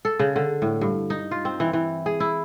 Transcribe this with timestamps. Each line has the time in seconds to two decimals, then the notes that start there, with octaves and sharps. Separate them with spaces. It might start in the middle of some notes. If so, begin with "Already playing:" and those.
0.05 A4
0.19 C#3
0.36 D3
0.62 A2
0.81 G2
1.10 D#4
1.31 F4
1.45 C4
1.60 E3
1.73 E3
2.06 G#4
2.20 E4